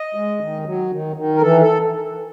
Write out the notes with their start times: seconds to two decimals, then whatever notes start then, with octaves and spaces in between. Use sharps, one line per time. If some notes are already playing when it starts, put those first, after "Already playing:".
Already playing: D#5
0.15 G#3
0.40 D#3
0.65 F#3
0.91 D#3
1.16 D#3
1.35 A#4
1.41 E3 A4
1.61 A4